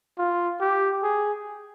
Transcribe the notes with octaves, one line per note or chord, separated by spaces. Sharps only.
F4
G4
G#4